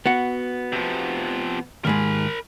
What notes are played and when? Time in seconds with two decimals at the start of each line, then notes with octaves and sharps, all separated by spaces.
0.06 B3 F#4 F#5
0.72 C3 F3
1.85 D#2 G#2 G#3 A#4 B5